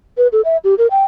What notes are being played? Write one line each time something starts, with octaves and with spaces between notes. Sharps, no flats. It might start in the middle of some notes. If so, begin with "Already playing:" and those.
B4
A4
E5
G4
A#4
G5